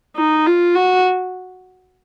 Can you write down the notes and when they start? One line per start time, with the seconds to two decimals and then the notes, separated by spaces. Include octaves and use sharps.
0.16 D#4
0.46 F4
0.75 F#4